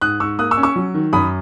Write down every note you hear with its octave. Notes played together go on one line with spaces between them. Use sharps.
G#2 D#6 F#6
G#2 C#6 E6
A#3 D#6 F#6
C#6 E6
C#4
C#6 E6
F#3
D#3
F#2 B5 D#6